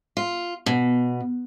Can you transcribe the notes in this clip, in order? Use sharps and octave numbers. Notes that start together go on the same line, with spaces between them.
F4
B2